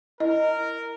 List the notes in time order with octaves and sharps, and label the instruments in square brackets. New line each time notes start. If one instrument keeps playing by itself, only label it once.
[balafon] E4 D#5 [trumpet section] A#4